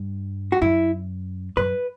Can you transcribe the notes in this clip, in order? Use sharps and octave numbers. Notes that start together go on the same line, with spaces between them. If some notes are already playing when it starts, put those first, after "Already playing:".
Already playing: G2
F#4
F#2 E4
F#2 B4